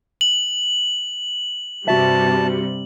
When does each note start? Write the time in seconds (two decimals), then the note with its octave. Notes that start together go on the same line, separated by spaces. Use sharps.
0.21 F#7
1.88 G2 C3 G3 F#4 E5 A5